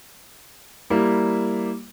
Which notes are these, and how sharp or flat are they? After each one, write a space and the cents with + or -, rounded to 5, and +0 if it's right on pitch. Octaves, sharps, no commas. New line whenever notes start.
G3 +0 A#3 +0 E4 +0